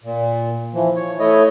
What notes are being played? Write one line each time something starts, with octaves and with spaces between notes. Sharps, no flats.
A#2
E3 F3
C#5
A3 E4 C#5 D#5